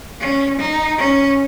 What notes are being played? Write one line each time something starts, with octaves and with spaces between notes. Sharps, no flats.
C#4
D#4
C#4